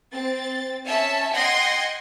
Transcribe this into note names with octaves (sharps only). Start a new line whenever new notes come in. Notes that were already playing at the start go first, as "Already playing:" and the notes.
C4 A6
C#4 E5 A5
D#5 F#5 G5 C6 G#6 A#6